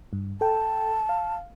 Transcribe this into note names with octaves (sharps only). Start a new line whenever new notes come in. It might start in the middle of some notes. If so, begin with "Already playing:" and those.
G2
A4 G5 A5
F5